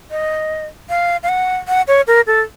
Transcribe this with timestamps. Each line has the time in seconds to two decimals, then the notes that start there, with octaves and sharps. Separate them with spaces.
0.11 D#5
0.90 F5
1.23 F5
1.29 F#5
1.68 F#5
1.88 C#5
2.07 A#4
2.27 A4